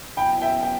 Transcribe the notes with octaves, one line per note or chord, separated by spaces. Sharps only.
C#3 F#3 B3 E4 G5 B5
E5 G5
G5